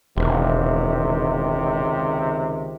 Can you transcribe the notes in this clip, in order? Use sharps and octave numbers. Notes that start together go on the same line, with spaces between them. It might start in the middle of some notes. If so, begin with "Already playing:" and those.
E1 C#2 C3 D#3